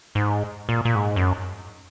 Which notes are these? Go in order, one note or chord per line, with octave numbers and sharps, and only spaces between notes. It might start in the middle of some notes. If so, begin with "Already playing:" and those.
G#2
A#2
A#2
G#2
F#2